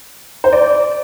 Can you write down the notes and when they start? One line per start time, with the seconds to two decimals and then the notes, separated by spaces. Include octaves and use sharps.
0.44 C5
0.53 D5